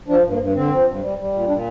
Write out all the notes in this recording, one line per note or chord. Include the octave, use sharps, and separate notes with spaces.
F3 D4
G2
A#3
G2
D3 C4
F3
G2
G3
G3
A#2
A#2 D4